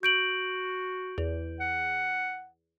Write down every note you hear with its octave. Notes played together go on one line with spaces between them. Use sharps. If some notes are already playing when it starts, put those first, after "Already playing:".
F#4 G6 D7 F#7
E2
F#5